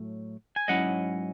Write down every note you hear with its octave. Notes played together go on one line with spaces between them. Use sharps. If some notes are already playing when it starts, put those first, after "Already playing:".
Already playing: A2 F#3 A3
G#5
G#2 F#3 C#4 E4 D#5 F#5